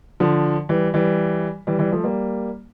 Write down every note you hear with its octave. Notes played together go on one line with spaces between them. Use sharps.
D3 F3
E3 G3
E3 G3
E3 G3
E3 G3
F3 A3
G3 A#3